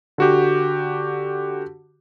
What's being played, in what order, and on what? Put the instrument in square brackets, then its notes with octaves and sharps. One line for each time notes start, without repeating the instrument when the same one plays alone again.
[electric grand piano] D3 F#4 G4